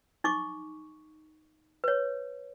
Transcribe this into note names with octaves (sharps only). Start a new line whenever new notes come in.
D#4 C#6 D6
B4 C#5